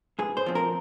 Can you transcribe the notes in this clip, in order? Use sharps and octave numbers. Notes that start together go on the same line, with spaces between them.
G2 G#4
C5
F3 C4
A#4